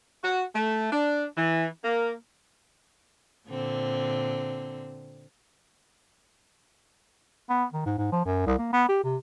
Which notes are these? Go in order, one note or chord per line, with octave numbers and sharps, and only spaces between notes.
F#4
A3
D4
E3
A#3
A#2 D3 C4
B3
D#3
G#2
G#2
F3
F#2
C2
A#3
B3
G4
C3